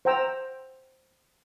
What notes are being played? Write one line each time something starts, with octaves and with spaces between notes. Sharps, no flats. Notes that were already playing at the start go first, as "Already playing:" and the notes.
C5 F#5 G5 A#5 E6